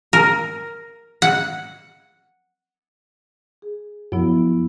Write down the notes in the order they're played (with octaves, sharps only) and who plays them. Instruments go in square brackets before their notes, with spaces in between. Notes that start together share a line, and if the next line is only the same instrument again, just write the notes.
[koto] A#4
F#5
[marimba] G#4
[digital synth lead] F#2 [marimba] F3 B3 E4